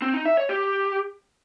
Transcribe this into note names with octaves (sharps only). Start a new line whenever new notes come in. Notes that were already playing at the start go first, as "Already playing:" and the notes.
C4
D#4
E5
C#5
G4